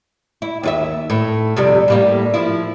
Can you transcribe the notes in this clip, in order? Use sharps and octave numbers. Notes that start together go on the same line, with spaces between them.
E4
D#2 F4 E5
A2
F2 C3 G3
A2 G3 A#3
F3 E4